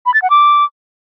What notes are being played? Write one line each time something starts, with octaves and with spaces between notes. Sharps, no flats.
B5
A6
F#5
D6